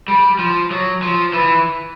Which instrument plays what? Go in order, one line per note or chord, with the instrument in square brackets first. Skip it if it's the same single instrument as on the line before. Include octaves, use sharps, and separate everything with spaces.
[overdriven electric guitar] G3
F3
F#3
F3
E3